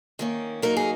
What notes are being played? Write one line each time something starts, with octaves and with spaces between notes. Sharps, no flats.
D#3 A#3 C#4
F#3 A#3 D#4 A#4
G#4